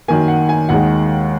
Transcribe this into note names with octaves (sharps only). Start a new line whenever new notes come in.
F#2 D#3 A#3 G#5
F#5
G#5
D#2 D#3 G#3 F#5